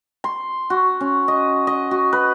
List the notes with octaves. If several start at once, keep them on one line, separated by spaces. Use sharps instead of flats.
C6
F#4
C#4
D#5
D#5
F#4
B4